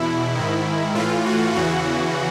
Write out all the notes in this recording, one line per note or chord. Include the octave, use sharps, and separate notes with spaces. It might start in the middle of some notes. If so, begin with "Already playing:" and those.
Already playing: E2 B2 E4
G#2 D#3
A2 E3 F4
F#4
E2 C#3 E3 F#4